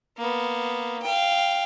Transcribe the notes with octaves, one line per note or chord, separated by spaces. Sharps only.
A#3 B3
F5 G5